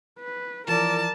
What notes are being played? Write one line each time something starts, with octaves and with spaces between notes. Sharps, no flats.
B4
E3 F3 A#4 D5 A5